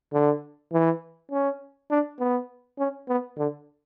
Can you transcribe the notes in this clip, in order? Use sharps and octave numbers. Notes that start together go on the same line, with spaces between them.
D3
E3
C#4
D4
B3
C#4
B3
D3